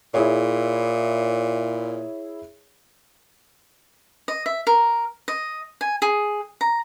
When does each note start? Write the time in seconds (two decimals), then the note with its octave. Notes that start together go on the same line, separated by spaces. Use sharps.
0.14 A#2 E4 G#4 C#5
4.28 D#5
4.46 E5
4.67 A#4
5.28 D#5
5.81 G#5
6.02 G#4
6.61 A#5